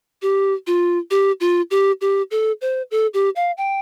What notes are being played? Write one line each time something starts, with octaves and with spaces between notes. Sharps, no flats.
G4
F4
G4
F4
G4
G4
A4
C5
A4
G4
F5
G5